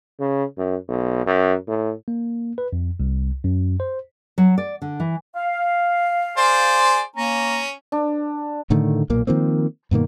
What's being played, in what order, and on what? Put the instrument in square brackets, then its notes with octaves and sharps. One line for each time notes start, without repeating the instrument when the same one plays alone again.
[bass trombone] C#3
F#2
B1
F#2
A2
[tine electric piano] A#3
B4
F2
C2
F#2
C5
[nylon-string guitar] F#3
D5
D3
E3
[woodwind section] F5
[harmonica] G#4 C5 D5
[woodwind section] A#3 A#5 [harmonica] C#4
[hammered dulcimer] D4
[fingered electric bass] A2 D3 D#3 A3
B1 A#2 A#3
D#3 F3 A#3 C4
G2 B2 D#3 A#3